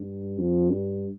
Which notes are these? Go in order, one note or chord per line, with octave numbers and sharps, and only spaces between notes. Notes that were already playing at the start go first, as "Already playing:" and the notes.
Already playing: G2
F2
G2